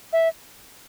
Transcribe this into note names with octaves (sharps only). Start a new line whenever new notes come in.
E5